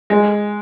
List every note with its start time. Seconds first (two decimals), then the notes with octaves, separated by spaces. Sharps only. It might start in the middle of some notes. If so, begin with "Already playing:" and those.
0.10 G#3